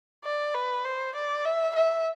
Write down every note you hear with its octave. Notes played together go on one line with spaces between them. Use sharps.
D5
B4
C5
D5
E5
E5